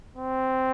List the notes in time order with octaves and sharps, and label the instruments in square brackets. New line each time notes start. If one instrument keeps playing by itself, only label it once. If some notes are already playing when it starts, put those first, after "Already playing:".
[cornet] C4